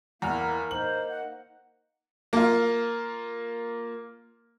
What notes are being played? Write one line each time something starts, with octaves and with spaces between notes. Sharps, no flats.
E2 A#3 E4 A#5 F6
A#3 D#4 C5 F#7
F#5
A#3 F4